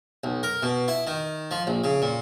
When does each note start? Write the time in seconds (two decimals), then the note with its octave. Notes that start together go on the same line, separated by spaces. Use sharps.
0.24 B1
0.43 A#4
0.63 B2
0.88 E4
1.07 D#3
1.51 F3
1.67 A#1
1.84 C#3
2.02 A#2